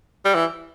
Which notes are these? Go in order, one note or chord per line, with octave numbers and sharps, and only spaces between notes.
G3
E3